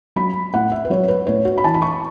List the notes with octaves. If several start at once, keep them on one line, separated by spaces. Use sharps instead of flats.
F#3 B5
A2 F#5
E5
B4
F#3 C#5
B4
A2 C#5
F#4
B5
E3 A5
B5
C#6